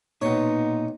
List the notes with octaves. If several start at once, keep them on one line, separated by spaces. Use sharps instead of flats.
B1 A#2 B3 D#4 C#5